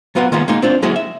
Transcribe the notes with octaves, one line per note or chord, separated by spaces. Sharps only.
F#3 B3 F4 A#4 F#5
D#3 G#3 A#3 B3 F4
G#3 A#3 D#4
C4 D4 F4
F#3 G#3 A#3 E4 F#4 G#4
E5